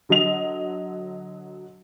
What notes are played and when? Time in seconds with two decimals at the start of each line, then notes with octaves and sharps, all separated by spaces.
0.09 D3 F#3 D#5 F7